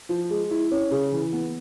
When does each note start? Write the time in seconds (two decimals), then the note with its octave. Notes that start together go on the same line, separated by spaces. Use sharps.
0.09 F3
0.30 G#3
0.51 E4
0.71 C#4
0.91 C#3
1.12 E3
1.33 B3